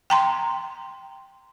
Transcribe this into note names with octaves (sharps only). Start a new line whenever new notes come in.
G5 A#5 C6